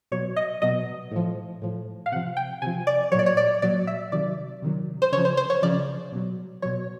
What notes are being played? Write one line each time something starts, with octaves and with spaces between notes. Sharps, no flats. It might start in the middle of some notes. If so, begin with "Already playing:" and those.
B2 F#3 C#5
D#5
B2 F#3 D#5
A2 F3
A2 F3
F5
C3 F3 F#5
G5
C3 F3 G#5
D5
A#2 F#3 C#5 D5
C#5
D5
A#2 F#3 D5
E5
C3 D#3 F#3 D5
C3 D#3 F#3
C5
C#3 F3 C#5
C5
C5
C#5
C#3 F3 D5
B2 F#3
B2 F#3 C#5